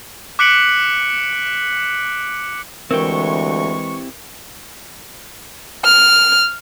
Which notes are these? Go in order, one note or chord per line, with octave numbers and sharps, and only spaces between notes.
D6 F#6 B6 C#7 D7 F#7
D2 E3 G#3 C4 E4 G4 A#4 C#6
F6